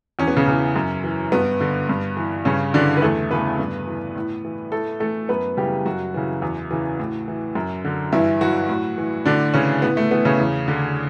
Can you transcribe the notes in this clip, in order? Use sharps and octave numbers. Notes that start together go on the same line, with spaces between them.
E2 C#4
B3
C#3 C#4
C#3 E3
F#2
E3
G2 B3
D3
G2
E3
G2 C#3 C#4
D3 E3 D4
B4
E2 A3 A4
C#3 E3 B3 B4
G2
E3
A2
E3
A2 A3 A4
E3 A3 A4
F#2 B3 B4
C#3 E3 G3 G4
F#2 F#3 F#4
C#3 E3
E2
C#3 E3
A2
E3
F#2
D3
G2 E3 E4
E3 F#3 F#4
A2
E3
A2 D3 D4
C#3 E3 C#4
A2 B3
A3
E3 B3
C#3 C#4
E2
D3